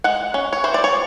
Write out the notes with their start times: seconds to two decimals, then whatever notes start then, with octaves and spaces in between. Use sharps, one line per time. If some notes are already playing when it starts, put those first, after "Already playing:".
0.04 G#3 F#5
0.34 C#4
0.53 C#5
0.64 E3 C5
0.74 D5
0.84 C#5